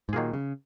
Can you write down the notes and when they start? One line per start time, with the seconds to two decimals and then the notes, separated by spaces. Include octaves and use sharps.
0.09 G#2
0.13 A#2 D#3 F#3 A#3 F4 G#4
0.33 C#3